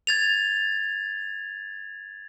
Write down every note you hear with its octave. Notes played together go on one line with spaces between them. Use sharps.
G#6 A6 F7